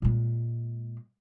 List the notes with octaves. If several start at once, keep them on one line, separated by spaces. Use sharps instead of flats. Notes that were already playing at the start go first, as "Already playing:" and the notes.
A#2 G#3